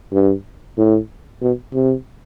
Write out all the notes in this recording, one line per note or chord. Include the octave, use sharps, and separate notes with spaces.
G2
A2
B2
C3